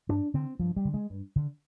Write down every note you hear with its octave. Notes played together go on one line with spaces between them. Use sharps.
G2 D4
D3 C4
G2 F3
G3
D3
G#3
G2
D3